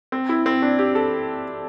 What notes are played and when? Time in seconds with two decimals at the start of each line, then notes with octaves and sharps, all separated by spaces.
0.12 C4
0.29 E4
0.46 C4
0.62 D4
0.79 G4
0.95 A4